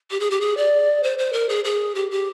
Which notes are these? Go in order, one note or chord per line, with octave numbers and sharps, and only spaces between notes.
G4
G#4
G4
G#4
D5
C5
C5
A#4
G#4
G#4
G4
G4